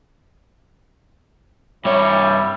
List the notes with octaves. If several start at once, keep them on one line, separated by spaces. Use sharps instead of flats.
G2 G3 C#4 E4 C#5